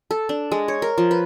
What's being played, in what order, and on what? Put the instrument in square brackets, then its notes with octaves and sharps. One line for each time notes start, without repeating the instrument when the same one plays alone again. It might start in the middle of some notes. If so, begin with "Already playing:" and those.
[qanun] A4
D4
G#3
C#5
A#4
F3
B4